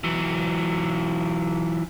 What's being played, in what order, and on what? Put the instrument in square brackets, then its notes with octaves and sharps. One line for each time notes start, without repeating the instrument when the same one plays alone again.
[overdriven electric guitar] E3 F#3